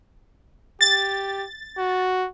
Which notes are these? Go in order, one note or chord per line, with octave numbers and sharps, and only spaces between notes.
G4 A6
F#4